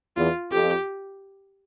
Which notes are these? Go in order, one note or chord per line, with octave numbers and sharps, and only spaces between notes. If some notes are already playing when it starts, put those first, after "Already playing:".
E2 F4
F2 G4